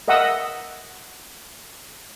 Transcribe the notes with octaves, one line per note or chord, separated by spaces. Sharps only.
A#4 D#5 E5 F#5 D#6 E6